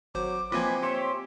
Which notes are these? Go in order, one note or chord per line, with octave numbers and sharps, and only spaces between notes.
G#1 F#3 C5 D6
F3 A#3 C4 F4 B4 D#5 G#5
G4 C#5 E5 C6